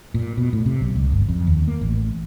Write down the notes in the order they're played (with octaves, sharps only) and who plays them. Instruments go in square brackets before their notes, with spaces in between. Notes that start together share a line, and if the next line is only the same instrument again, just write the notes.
[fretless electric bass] A#2
B2
A2
C3
B1
C#2
G1
F2
D#2
A#3
A1